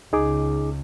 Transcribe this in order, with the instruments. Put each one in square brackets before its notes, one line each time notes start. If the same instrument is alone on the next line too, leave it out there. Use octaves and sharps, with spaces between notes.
[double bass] C#2 [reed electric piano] D#4 G#4 D6